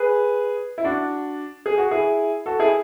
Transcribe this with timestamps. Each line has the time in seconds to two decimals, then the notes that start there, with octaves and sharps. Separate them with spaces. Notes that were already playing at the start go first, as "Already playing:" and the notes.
Already playing: G#4 B4
0.78 E4
0.84 D4 F#4
1.66 G#4
1.78 F#4
1.91 E4 G#4
2.46 F#4 A4
2.59 E4 G#4